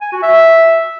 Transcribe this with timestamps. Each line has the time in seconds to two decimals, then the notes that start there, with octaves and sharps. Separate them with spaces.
0.01 G#5
0.12 F#4
0.23 E5